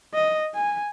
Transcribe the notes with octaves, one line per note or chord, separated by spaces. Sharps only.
D#5
G#5